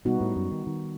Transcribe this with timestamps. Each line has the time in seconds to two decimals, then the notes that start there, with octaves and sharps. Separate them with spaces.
0.05 B2 G3 B3 D#4 F#4
0.21 A2
0.36 F#2
0.52 D#3
0.67 D#3